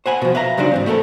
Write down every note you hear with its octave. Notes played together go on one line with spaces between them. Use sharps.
C5 F#5 G#5 B5
B2 F3
B4 E5 F5 A#5
C#3 F#3 G3 D4 D#4 C5
G#2 E3 C4
A3 B3 E4 A4 A#4